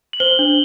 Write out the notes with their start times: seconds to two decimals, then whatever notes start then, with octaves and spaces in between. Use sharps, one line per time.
0.13 F#7
0.20 C5 G7
0.39 D4